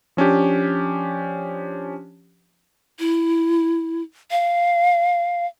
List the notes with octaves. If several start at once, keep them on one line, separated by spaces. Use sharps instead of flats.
F3 C#4 D4 G4
E4
F5